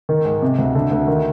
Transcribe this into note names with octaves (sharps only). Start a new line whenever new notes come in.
D#3
G#2
C3
D2
D3
D2
D#3